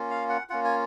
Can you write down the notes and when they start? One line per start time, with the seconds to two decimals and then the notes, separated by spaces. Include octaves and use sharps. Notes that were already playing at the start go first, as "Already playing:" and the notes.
Already playing: A#3 C#4 F4
0.10 F5
0.29 F#5
0.50 A#3 C#4 F4 F#5
0.64 G#5